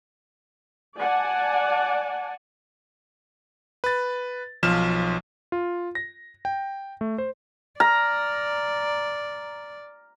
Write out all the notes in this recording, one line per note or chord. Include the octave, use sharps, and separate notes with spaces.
D5 F#5 G#5 A5
B4 A6
B1 F3 F6 E7
F4
A#6
G5
A3
C5
D5 A#5 F6